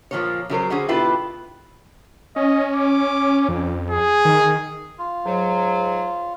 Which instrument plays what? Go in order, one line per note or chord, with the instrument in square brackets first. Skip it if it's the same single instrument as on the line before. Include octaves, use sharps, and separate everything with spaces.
[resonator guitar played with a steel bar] A#2 F3 G#3 A#3 A#4 C#5
C#3 F#3 A#4 C5
D3 C#4 F#4 G#4 C5
B2 E4 F4 G4 A4 B4
[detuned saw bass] C#4 [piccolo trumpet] D#5
[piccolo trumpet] D6
[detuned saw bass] F2
[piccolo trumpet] G#4
[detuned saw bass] D#3
[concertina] F4
[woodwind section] G#2 F#3